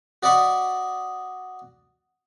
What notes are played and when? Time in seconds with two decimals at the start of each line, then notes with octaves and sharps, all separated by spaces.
0.23 F#4 D5 D#5 F#5 B5 C#6